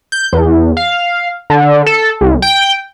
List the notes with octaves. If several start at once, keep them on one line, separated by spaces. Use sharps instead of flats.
G6
E2
F5
D3
A4
C2
G5